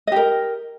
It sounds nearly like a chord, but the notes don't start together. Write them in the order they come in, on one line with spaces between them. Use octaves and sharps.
D#5 G4 A#4